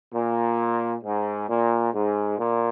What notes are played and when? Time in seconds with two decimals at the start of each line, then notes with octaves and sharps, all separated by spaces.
0.13 A#2
1.03 G#2
1.48 A#2
1.94 G#2
2.38 A#2